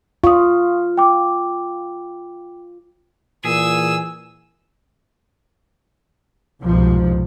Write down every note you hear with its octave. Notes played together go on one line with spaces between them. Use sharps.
F4 C#6 D#6
G5 D6
A#2 E3 G#4 E6
C2 F2 G#2 B2 F3